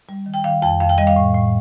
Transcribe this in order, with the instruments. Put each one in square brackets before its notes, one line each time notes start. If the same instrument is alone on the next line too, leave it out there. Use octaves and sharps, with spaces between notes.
[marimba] G3
D#3
G5
D#3 F5
F2 G5
F2 F5
G5
G3 D#5
F5
A2
A2